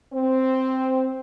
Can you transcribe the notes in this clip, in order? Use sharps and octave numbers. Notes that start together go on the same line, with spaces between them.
C4